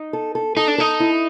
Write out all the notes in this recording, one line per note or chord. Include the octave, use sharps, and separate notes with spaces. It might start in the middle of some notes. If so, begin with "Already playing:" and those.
Already playing: D#4
A4
A4
D#4 A4
D4
D#4 A4
E4